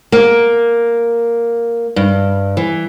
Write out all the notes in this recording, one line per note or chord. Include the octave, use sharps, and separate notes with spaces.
A#3
G2
E3